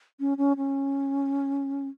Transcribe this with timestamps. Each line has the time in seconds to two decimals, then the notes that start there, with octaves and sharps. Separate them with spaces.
0.20 C#4
0.38 C#4
0.57 C#4